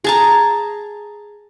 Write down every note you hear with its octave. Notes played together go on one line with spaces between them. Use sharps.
G#4 A5 A#5